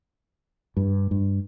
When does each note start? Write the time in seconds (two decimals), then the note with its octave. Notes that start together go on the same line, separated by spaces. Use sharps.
0.77 G2
1.11 G2